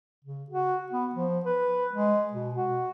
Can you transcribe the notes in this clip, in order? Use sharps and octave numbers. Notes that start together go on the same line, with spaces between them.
C#3
F#4
B3
F3
B4
G#3
B2
F#4